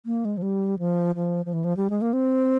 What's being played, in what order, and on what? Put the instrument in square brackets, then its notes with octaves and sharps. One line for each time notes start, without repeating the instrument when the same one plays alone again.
[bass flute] A#3
G#3
F3
G3
F3
F3
F3
E3
F3
G3
G#3
A#3
C4